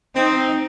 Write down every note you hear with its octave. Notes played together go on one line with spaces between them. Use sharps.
C4 D#4